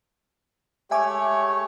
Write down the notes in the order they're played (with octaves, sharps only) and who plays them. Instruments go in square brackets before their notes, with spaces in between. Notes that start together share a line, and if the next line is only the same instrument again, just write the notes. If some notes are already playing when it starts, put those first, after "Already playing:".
[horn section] G#3 G4 C#5 [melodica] A3 [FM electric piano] E5 G#5 D6